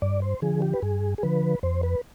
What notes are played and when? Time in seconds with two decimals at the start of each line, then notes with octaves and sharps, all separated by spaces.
0.02 G2 D5
0.22 C5
0.42 D3 F3 G#4
0.62 G4
0.73 B4
0.82 G2 G#4
1.18 G#4
1.23 D3 F3 B4
1.63 F2 C5
1.83 B4